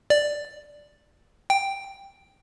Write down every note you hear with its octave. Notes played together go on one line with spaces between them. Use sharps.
D5
G5